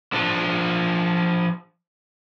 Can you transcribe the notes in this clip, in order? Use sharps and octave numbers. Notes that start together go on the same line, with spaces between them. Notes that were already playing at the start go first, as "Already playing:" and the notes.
F3 D4